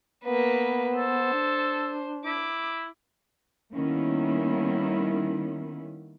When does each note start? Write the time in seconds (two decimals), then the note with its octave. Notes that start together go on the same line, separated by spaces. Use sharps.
0.25 A#3 B3 B4
0.96 A4 C5
1.33 D4
2.25 E4 D6
3.74 D#3 G3 A#3 B3 C#4 E4